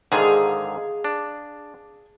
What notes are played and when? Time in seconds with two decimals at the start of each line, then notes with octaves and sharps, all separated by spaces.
0.12 G#2 D3 D#3 G#4 F5
1.04 D4